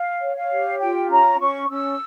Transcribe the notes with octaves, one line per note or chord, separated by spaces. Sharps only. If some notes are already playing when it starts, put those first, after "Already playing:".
Already playing: F5
C#5
F5
G4
F4 G5
C#4 A#5
C#4 C#6
C#4 E6